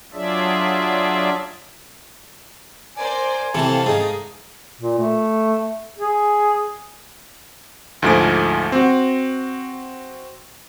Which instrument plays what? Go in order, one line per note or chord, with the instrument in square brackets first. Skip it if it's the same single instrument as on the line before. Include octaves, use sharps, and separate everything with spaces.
[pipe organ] F#3 D4 F4 G#4 D5 E5
[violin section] A#4 C5 D5 [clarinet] G#5
[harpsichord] C3 E3 [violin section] A3 F5 A6 [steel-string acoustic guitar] C4 A4
[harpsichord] G#2 D#4 [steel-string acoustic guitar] G#4
[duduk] A#2
A3
G#4
[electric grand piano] D2 G#2 F3 A3 G#5 D7
C4 F#4